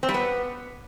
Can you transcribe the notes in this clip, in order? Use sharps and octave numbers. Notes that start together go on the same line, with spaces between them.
C4
G3
B3